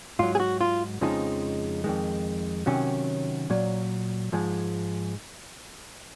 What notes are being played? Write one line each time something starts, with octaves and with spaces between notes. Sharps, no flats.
G#2 F#3 F4
G#4
F#4
F4
F2 C#3 F3 G#3 D#4
F2 D#3 G#3
C3 D#3 F#3 C#4
A#2 F#3
G#2 F3 G#3